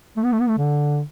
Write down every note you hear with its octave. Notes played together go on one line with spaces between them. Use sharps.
A3
B3
A3
B3
A3
D3